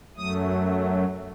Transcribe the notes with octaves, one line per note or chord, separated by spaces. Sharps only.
F#2 F#3 A3 D#6